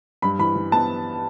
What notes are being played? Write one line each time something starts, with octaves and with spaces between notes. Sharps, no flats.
G2 B5
E3 B5
E3
B3 A5